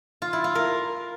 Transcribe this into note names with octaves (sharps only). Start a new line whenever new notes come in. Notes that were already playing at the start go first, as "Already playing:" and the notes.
F4
E4
F4
A#4